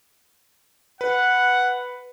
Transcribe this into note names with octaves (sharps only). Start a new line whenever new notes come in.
B4 F#5